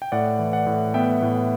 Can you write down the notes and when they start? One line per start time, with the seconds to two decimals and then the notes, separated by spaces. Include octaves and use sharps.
0.02 G5
0.12 A2 D5 F#5
0.39 E3
0.53 D5 F#5
0.67 A2
0.94 B3 E5 G5
1.22 A2